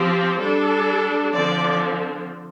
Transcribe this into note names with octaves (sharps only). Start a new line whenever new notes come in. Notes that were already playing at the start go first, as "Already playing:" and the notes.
Already playing: F3 C4 G4
G3 D4 A4
D3 F3 C4 D5